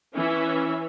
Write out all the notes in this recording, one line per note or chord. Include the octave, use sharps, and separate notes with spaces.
E3 C#4 E5